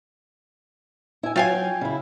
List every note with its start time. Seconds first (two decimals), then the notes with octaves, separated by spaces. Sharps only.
1.23 E4 G#5
1.36 F#3 F4 F5 G5 G#5
1.81 C#3 E4